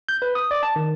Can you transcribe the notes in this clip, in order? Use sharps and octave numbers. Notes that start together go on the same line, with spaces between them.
G6
B4
D#6
D5
A5
D#3